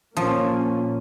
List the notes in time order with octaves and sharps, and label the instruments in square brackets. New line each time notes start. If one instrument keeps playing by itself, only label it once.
[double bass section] A#2 A#3 C#4 [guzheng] F3